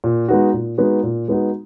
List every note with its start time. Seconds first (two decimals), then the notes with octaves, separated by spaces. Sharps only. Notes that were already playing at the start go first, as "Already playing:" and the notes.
0.04 A#2
0.28 G#3 B3 D#4 F#4
0.53 A#2
0.78 G#3 B3 D#4 F#4
1.03 A#2
1.28 G#3 B3 D#4 F#4